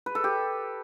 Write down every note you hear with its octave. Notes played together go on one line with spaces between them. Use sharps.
B4
A4
G4